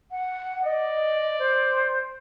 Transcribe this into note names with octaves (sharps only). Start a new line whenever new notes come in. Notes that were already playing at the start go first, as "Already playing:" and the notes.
F#5
D5 D#5
C5